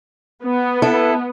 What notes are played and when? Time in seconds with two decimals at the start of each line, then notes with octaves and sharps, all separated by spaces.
0.45 B3
0.82 E4 A4